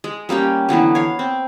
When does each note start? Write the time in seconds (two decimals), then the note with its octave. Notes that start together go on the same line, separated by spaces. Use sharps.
0.04 G#3
0.29 G3 A#3 C#4 G4
0.69 D3 E3 F#3 B3
0.95 C#5 F5
1.19 C4